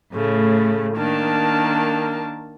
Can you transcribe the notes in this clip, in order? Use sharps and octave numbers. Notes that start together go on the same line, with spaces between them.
A2 C#3 A3
D#3 A#3 D4 A5